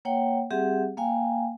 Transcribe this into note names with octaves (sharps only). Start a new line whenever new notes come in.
A#3 C#5 F#5 G5
G3 C4 G4 G#4 E5 F#5
A#3 F5 G5 G#5